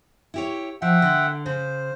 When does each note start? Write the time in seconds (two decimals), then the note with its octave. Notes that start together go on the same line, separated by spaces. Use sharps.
0.34 E4 G4 C#5
0.82 F3 E5 F#5 G5
1.02 D3
1.46 C#3 C5